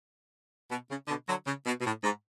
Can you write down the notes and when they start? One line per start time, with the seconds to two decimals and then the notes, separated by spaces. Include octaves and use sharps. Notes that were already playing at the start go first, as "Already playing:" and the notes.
0.70 B2
0.89 C#3
1.08 B2 D3
1.27 D3 F#3
1.46 C#3
1.65 B2
1.80 B2
1.85 A2
2.03 G#2